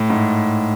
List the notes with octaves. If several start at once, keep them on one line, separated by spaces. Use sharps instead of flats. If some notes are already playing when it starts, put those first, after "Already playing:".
Already playing: A2
G#2